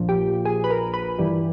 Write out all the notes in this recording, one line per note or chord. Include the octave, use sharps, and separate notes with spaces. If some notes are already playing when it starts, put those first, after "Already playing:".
Already playing: A#1 A#2 F3
G4
G#4
B4
A#4
B4
G2 E3 G3